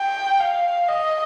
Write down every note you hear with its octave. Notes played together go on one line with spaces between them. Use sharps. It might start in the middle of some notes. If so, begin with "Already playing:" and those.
Already playing: G5
F5
D#5